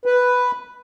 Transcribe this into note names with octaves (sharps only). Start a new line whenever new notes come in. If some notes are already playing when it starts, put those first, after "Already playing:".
B4